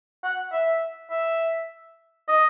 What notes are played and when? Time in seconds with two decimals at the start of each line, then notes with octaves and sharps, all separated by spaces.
0.24 F#5
0.53 E5
1.11 E5
2.28 D#5